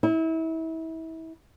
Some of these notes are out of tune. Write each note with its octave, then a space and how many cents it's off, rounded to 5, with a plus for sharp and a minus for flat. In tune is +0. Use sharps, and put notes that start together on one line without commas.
E4 -30